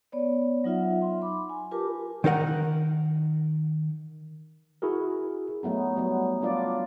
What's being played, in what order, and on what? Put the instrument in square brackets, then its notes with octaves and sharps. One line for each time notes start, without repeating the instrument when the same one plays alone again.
[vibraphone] B3 C#5 D5
F#3 D#4 F4 E5 F#5
C6
B5 D6
G#5
F4 G4 A#4 B4 A5 D6
[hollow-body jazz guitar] D#3 D#4 A#4 F#5
[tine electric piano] E4 F#4 G#4 A#4
[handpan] F#3 A3 B3 D#4
F#3 G3 B3
F#3 D4 F4 D5